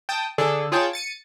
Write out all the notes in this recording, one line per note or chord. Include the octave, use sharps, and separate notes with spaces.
G5 A5 D#6
D3 D4 G#4 A4
F4 G#4 C#5 G5 A5
A6 C#7 D#7